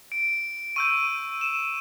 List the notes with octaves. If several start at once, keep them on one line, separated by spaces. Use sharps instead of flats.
D7
C#6 E6 G6 D#7
E7